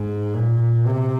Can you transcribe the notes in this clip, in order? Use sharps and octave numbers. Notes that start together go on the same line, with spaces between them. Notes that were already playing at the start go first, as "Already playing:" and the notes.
Already playing: G#2
A#2
C3